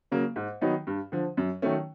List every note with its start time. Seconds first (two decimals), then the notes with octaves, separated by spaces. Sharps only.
0.12 C#3 F#3 A#3
0.36 G#2
0.61 D#3 F#3 B3 D#4
0.87 G2
1.12 D3 F3
1.37 F#2
1.62 D#3 F#3 A3 C#4